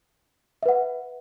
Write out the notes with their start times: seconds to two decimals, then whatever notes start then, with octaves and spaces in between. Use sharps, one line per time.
0.63 E5
0.66 B4
0.69 F#5